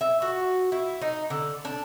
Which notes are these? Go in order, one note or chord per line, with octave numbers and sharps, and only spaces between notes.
E5
F#4
E4
D#4
D3
D4